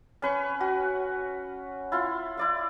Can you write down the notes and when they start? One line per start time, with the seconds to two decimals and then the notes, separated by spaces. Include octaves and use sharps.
0.22 C#4 B4 C#6
0.60 F#4
1.92 E4 F4 C6
2.37 E4 D5 F5